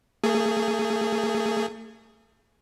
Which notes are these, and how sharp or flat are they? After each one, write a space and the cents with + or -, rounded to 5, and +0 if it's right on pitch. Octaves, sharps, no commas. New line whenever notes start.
A3 +40 G#4 +0